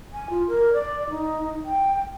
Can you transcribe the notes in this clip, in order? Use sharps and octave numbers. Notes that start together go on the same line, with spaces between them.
G#5
F4
A#4
D5
D#4
G5